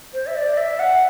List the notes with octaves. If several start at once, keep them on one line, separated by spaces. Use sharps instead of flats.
C5
E5
D5
E5
F#5